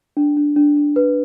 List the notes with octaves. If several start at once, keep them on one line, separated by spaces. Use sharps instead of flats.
D4
D4
D4
D4
B4